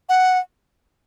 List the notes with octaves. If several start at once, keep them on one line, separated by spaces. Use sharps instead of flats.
F#5